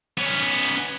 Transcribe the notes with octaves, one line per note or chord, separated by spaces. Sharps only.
B3 C#4